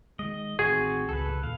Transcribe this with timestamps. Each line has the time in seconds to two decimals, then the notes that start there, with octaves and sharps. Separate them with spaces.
0.19 D#3 G#3 D#5
0.59 A1 D#3 C4 F#4 G#4
1.09 C#2 A4 B4
1.43 D#2 A#2 F5